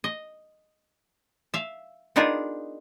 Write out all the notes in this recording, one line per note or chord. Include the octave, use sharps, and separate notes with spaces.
D#5
E5 F5
B3 D4 D#4 F4 G#4 A#4